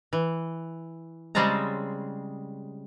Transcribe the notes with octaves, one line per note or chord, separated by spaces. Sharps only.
E3
C#3 G3 G#3 C4 A5 A#5